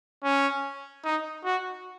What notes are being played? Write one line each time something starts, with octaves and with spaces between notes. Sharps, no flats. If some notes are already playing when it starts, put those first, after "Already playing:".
C#4
D#4
F#4